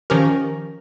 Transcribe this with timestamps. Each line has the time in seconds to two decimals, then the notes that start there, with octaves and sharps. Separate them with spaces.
0.10 D#3 F3 C#4 G4 A#4